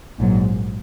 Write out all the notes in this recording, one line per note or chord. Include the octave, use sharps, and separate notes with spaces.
A#1 G#2 F#3